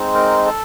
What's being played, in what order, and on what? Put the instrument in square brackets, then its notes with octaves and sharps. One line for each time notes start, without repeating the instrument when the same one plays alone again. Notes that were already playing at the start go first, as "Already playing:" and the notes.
Already playing: [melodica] G#3 C4 D#4
A#4
A4